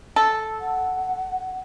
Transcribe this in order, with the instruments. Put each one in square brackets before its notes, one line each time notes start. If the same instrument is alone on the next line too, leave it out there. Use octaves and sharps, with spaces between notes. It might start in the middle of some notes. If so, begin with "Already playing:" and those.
[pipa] A4
[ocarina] F#5